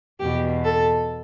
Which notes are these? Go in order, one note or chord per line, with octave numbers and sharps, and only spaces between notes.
E2 B2 G4
A4